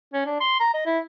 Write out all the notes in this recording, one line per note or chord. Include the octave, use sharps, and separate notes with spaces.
C#4
D4
C6
A#5
D#5
E4